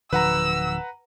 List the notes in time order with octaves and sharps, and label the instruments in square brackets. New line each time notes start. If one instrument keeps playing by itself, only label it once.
[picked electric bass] D1 D3 F3 [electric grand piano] B4 F#5 A#5 [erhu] E6